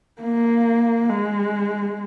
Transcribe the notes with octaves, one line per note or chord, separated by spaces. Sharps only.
A#3
G#3